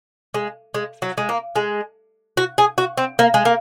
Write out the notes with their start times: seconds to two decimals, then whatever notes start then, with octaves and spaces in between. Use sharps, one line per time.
0.34 G#3
0.74 G#3
1.02 F#3
1.18 G#3
1.29 A#3
1.56 G#3
2.37 F#4
2.58 G#4
2.78 F#4
2.97 C4
3.19 A#3
3.34 G#3
3.45 A#3